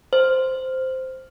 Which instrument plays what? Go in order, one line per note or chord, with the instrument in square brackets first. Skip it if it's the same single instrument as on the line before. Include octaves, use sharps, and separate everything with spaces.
[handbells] C5